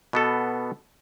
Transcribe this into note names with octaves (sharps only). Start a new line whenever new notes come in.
B2 B3 A4